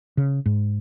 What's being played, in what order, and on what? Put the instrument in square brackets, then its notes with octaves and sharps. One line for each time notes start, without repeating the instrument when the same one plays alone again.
[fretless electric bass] C#3
G#2